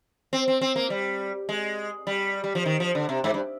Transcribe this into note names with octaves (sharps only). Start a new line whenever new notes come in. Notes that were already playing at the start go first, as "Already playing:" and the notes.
C4
C4
C4
A#3
G3
G#3
G3
G3
F3
D#3
F3
D3
C3
G#2
G2